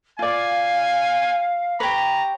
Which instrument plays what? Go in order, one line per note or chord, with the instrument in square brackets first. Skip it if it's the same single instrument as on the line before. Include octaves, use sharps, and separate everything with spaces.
[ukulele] F4 D5 [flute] F5 [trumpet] G#5
[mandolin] G4 C#5 [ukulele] B4 [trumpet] A#5